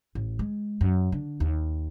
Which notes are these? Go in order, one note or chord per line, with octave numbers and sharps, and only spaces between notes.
A1
G#3
F#2
D3
D#2